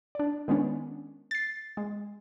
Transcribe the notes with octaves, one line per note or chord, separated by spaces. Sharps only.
D4 D5
D#3 G#3 B3 C#4 D4
A6 C7
G#3